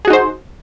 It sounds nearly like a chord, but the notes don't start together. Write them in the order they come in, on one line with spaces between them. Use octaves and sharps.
G#4 F#4 D#4 C5